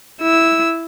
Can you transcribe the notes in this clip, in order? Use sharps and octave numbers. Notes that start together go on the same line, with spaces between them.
E4 E6